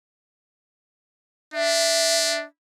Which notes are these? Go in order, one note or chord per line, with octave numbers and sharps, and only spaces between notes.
D4 E5